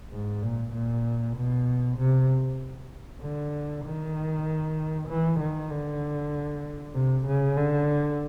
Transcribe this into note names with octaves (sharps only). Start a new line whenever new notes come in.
G#2
A#2
A#2
B2
C3
D3
D#3
E3
D#3
D3
C3
C#3
D3